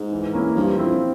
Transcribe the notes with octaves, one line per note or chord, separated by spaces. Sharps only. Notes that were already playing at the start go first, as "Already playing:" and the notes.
Already playing: G#2
E3
A#3 C#4 E4
G2 F3
F2 C4 E4